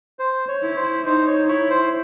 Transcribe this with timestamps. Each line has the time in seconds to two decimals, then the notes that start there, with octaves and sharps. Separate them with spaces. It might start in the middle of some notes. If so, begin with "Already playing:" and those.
0.19 C5
0.48 C#5
0.62 E4
0.76 C5
1.06 D#4 C5
1.27 C#5
1.49 E4 C#5
1.70 C5